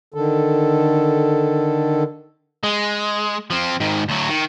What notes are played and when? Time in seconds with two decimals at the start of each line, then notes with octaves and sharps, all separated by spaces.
0.14 D3 D#3 A4
2.63 G#3
3.50 F3 C4
3.80 G#2 D#3
4.09 D2 F#3
4.29 D#3